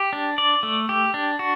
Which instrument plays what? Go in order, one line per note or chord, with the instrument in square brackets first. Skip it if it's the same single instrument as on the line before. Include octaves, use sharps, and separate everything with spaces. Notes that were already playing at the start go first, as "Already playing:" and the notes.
Already playing: [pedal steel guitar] G4
D4
D5
A3
G4
D4
F#4